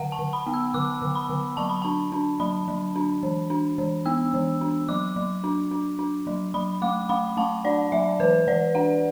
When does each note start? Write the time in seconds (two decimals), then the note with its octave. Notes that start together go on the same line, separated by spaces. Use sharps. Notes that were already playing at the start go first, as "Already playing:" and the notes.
Already playing: D3 F#5
0.12 A5
0.19 D3
0.33 B5
0.47 B3
0.54 E6
0.74 D3 D6
1.02 D3
1.15 B5
1.29 D3
1.57 F#3 A5
1.70 B5
1.82 D4 A5
2.12 D4
2.40 F#3 B5
2.68 F#3
2.96 D4
3.23 E3
3.50 D4
3.78 E3
4.06 B3 E6
4.34 E3
4.61 D4
4.89 F#3 D6
5.16 F#3
5.44 D4
5.71 D4
5.99 D4
6.27 F#3
6.54 F#3 B5
6.82 A3 D6
7.09 A3 B5
7.37 A3 A5
7.65 D4 D5
7.92 F#3 E5
8.20 E3 B4
8.47 E3 D5
8.75 D4 F#5